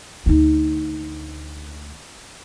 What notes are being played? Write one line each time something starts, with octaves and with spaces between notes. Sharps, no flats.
D2 D#4